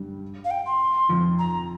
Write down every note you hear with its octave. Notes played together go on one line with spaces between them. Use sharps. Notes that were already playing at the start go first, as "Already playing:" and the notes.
Already playing: G2 G3
F5
G5
C6
F2 F3
A#5